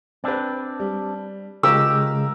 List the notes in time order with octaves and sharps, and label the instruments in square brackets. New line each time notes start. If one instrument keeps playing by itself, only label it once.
[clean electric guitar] C4 D4 [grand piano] B4 D5
[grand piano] G3
[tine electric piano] C#3 G#3 [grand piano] F4 A#4 A#5 [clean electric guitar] G4 [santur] E6